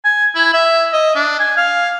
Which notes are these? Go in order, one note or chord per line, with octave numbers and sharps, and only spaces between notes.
G#5
E4
E5
D#5
D4
G#5
F5